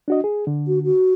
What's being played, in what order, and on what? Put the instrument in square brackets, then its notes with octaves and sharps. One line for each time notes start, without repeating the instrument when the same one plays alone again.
[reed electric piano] D4 F#4 D#5
G#4
D3
[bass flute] F#4
F#4